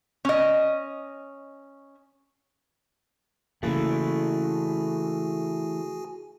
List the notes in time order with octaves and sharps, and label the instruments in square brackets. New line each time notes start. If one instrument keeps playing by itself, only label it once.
[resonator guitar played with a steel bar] C#4 D#5
[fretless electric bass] C#3 A#3 [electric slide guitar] E3 A3 [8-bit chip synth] F#4 G#4 G#5